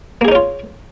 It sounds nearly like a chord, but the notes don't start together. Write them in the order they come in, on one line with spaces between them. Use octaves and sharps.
A#3 G#4 D#4 C#4 F4